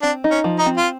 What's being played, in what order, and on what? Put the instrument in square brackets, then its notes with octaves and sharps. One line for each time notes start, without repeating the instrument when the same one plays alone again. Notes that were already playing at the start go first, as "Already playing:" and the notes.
[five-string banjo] C4 [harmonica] D4
[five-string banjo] D#4
[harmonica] C#4
[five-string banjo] F3
[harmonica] D#4
[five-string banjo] C4
[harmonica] F4